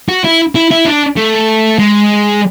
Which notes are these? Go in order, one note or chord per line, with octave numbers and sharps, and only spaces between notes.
F#4
E4
E4
E4
D4
A3
G#3